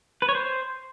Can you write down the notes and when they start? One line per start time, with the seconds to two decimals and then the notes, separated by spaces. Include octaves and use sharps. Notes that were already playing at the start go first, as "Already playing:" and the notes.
0.22 B4
0.29 C#5
0.35 C5